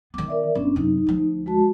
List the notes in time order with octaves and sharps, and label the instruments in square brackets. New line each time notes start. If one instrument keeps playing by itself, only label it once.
[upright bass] D#3 B3 [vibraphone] D6
[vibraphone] A#4 D5 E5
[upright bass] G1 [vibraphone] B3 C#4 D4
[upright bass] F#2 C3 [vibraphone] D#4
[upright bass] D2 F3
[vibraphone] G#3 F#4 A5